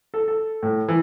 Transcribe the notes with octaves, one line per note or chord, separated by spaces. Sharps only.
A4
A4
A2
E3